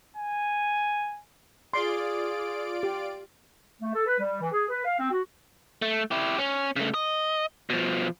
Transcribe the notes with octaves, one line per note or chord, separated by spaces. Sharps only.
G#5
F4 G#4 D5 C6 D7
G4
A3
A4
B4
G3
E3
G#4
B4
F5
C4
F#4
A3
E4 G4
C#4
C#3 A3
D#5
B2 F3